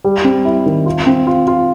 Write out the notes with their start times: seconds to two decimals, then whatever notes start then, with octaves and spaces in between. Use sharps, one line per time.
0.04 G3
0.25 C4
0.45 E4
0.66 D#3
0.86 F4
1.06 C4
1.27 F4
1.48 F4